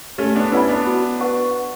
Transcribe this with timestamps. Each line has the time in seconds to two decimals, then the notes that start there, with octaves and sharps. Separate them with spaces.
0.18 A3 C#4 G4
0.35 B3 D4
0.52 C#4 E4 B4 F#5 B5
0.69 B3 D4
0.86 F#4
1.21 B4 F#5 C#6